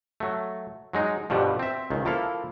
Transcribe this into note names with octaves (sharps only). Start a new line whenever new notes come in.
F#3 A3
F#3 G#3 D#4
G2 B2 D3 F3 G3
C4 E5
C#2 D#3
F3 A#3 E4 A4 F5